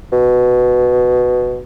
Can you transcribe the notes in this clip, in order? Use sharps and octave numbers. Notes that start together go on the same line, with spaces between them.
B2